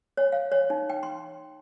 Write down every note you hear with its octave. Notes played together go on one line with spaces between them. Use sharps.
C#5
F5
C#5
D#4
G5
C6